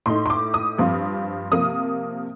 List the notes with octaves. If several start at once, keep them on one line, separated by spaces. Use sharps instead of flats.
A2 A3 D#4 C6
C6
D6
D#6
G2 F3 C4 F4
C3 F3 A#3 D#6